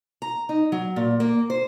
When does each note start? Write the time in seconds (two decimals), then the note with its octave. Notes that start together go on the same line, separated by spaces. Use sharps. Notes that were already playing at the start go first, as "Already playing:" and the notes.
0.22 A#5
0.49 D#4
0.72 F#3
0.96 A#2
1.20 A#3
1.50 C5